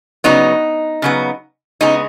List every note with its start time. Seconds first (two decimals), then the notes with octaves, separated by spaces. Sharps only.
0.24 C#3 F#3 B3 D#4
1.02 C#3 F#3 B3
1.81 C#3 G#3 B3 D#4